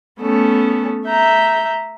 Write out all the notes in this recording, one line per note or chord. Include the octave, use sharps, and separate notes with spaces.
A3 B3 C#4 A4
E5 A#5 G6